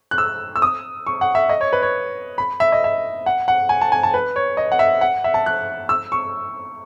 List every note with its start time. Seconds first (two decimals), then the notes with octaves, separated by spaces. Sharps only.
0.11 F#6
0.18 E6
0.56 E6
0.62 D#6
1.07 C#6
1.21 F#5
1.35 E5
1.49 D#5
1.61 C#5
1.73 B4
1.82 C#5
2.38 B5
2.60 E5
2.72 D#5
2.84 E5
3.26 F#5
3.48 F#5
3.69 G#5
3.81 A5
3.92 G#5
4.03 A5
4.14 B4
4.36 C#5
4.57 D#5
4.72 F#5
4.79 E5
5.01 F#5
5.24 E5
5.34 A5
5.46 F#6
5.89 E6
6.12 C#6